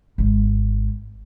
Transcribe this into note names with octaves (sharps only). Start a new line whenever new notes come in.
G#1 G#3